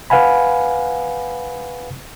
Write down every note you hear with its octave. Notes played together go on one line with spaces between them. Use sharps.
B4 F5 F#5 G#5 B5